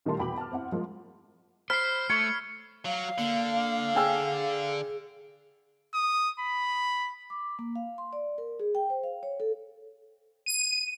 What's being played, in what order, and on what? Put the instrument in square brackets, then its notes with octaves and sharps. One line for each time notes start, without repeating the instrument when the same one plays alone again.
[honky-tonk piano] A#2 D#3 G3 A3 A5 C6
E2 B2 G5 B5 D6 F#7
A5 F6
C4 E4 F#5
F3 G#3 A#3 F4
[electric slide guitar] C5 [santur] B5 [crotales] F6 C7
[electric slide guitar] A3 [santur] C#5 [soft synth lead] C#7
[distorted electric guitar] F#3 [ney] F5
[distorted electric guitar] D3 [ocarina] A#3
[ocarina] G#4 [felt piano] G5 G#5 E6
[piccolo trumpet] D#6
B5
[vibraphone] D6
A#3
F5
C6
D5
A#4
G#4
G5
C5
F5
C#5
A4
[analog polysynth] D#7